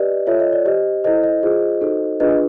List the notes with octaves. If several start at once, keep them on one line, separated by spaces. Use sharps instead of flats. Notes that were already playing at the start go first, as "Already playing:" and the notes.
Already playing: G4 B4 D5 D#5
F4 A4 C#5 E5
D#5
D5
G4 C5 D#5
E4 A4 C5 D#5
D#5
F4 G#4 C5
D#4 F#4 A4 C5
D4 F4 G#4 B4 D#5